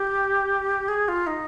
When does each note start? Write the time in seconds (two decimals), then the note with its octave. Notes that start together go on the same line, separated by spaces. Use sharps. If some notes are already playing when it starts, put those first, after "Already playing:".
Already playing: G4
0.88 G#4
1.08 F4
1.27 D#4